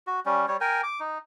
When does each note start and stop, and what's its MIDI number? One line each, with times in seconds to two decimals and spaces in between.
0.07 0.20 66
0.26 0.46 55
0.26 0.46 61
0.48 0.57 55
0.48 0.57 73
0.61 0.81 70
0.61 0.81 79
0.61 0.81 80
0.83 1.00 86
1.00 1.18 63